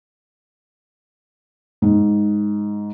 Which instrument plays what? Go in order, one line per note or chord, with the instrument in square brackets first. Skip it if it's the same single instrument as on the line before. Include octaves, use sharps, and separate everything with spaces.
[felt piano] G#2